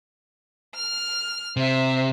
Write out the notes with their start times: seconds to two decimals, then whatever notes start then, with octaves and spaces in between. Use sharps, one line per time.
0.75 F6
1.57 C3 C5 E5